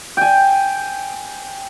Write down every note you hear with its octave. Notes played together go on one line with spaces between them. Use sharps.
G5 G#5